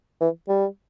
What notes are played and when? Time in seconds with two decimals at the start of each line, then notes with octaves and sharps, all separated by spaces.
0.20 E3
0.49 G3